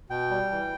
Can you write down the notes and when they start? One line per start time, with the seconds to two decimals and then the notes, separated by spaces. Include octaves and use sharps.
0.10 B2 G5
0.31 G3
0.51 E3